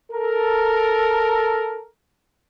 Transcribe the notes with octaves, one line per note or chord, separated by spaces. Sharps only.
A4 A#4